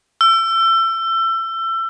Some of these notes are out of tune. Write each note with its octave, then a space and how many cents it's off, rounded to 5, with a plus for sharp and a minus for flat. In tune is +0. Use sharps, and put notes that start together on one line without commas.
E6 +30